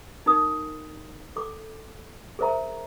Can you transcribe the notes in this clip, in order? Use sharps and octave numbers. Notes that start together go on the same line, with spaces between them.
D#4 A#4 D#6
A4 D6
G#4 A#4 C5 E5 A#5